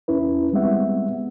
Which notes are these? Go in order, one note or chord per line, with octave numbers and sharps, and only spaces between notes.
E2 C#4 E4 B4
G3 G#3 B3 C4 E5 F#5